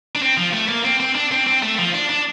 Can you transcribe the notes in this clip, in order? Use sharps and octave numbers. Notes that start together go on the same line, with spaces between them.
D4
C4
F3
A3
A#3
C4
C4
D4
C4
C4
A3
F3
D4
D4